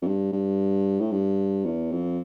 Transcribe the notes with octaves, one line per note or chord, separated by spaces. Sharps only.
F2
G2
G2
A2
G2
E2
F2